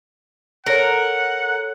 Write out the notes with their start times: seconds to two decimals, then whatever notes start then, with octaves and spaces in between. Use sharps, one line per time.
0.66 A4 A#4 C#5 F#5